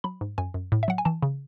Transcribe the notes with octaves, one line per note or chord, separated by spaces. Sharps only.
F#3 B5
G#2
F#2 G#5
F#2
A2
E5
F#3 F#5
G#5
E3 A5
C#3